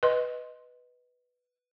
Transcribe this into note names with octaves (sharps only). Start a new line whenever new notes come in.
B4 D#5 C6